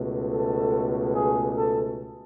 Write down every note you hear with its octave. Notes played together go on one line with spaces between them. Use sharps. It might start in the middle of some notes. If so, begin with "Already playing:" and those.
Already playing: C#2 B2 A3
A4
G#4
A4